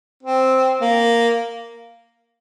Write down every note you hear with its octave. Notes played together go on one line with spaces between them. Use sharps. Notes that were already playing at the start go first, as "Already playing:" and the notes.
C4
A#3